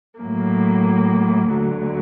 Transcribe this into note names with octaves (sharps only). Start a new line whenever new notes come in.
A2 F#3 A#3
D2 D3 F#3